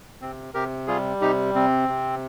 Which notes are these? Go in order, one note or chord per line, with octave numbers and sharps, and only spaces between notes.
C3 C4
C3 G4 A#4
G3 F4 G#4
C3 D#4 G4
C3 C4
C3